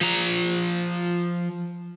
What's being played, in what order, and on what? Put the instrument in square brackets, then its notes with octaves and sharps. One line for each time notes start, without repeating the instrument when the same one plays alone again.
[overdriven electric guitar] F3 A#5